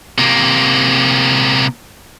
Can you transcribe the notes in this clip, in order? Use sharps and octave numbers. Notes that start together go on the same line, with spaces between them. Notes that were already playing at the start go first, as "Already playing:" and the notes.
C3 A#3